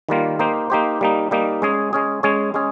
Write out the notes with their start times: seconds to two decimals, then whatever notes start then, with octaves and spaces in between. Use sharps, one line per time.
0.09 D#3 G3 A#3 F4
0.39 A#3 D#4 G4 C5
0.70 A#3 D#4 G4 C5
1.01 G3 A#3 D#4
1.31 G3 A#3 D#4
1.62 G#3 C#4 G#4
1.93 G#3 C#4 G#4
2.23 G#3 C#4 G#4 C#5
2.54 G#3 C#4 G#4